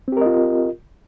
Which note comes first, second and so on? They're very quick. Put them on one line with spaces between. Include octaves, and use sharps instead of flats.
C4 G4 A#4 D#5 F4